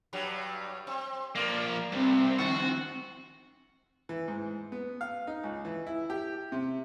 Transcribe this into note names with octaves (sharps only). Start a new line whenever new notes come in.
G2 F#3 G3
C4
F3 A#3 A#4 C#5 D5
C2 G2 C4
D3 F#4
E3
G#2
B3
F5
D#4
C#2
E3
E4
G4
C3